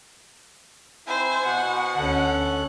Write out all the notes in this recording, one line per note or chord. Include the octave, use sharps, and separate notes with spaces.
C4 D#4 E4 C5 G#5
B2 F#5
D2 C#4 A4 F#6